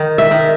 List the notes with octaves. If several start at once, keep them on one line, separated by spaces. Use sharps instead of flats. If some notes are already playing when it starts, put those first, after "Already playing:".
Already playing: D#3
E5
D#3